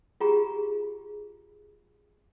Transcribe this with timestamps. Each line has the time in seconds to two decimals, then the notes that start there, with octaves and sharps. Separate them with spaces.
0.20 F4 G4 G#4 A#5